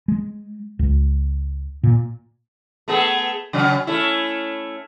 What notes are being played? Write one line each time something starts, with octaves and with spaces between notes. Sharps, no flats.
G#3
C#2
A#2
A3 B3 G#4
C#3 F#3 C#4
A3 C#4 E4